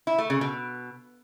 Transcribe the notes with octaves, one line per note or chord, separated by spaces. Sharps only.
E4
A3
C#3
B2